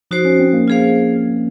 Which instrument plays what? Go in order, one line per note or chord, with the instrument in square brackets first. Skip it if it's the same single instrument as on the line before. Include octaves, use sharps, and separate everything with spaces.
[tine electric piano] F3 [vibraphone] D#4 F#4 C5
[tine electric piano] C#4
C4
A#3
[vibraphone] F4 G#4 C5 F5